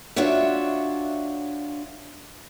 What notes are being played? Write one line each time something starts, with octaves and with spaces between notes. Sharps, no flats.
D4 F4 F#4 C#5 E5